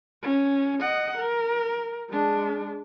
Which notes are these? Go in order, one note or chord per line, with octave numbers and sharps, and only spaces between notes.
C#4
D#5 F#5
A#4
G#3 D4